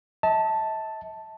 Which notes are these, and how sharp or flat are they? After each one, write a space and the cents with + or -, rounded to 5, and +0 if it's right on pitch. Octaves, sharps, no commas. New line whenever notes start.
E5 -45 A5 +0